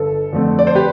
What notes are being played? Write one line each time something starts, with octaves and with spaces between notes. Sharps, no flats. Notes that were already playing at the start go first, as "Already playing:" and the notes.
Already playing: G1 A4
F2 D3 A3 C4
D5
C5
G4 B4